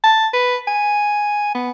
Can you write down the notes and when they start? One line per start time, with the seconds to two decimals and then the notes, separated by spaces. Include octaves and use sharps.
0.04 A5
0.33 B4
0.68 G#5
1.55 B3